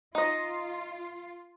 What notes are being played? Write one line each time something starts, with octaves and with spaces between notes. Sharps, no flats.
D#4 F4 D#5